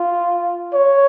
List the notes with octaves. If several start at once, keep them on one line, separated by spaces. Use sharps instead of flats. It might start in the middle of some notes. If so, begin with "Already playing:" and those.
Already playing: F4
C#5